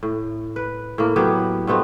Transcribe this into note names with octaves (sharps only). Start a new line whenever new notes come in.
A2
B4
A2 A#3
A2 F#3 B3 G4
G2 A3 B3 C4